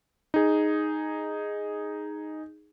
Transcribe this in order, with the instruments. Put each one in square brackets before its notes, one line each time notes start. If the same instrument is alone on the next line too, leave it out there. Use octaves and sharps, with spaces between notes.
[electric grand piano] D#4 G#4